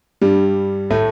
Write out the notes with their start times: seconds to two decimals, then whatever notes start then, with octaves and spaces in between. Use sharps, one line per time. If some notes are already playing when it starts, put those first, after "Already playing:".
0.22 G2 G3
0.90 A2 A3